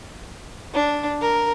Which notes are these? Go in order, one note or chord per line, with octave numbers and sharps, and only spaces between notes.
D4
A#4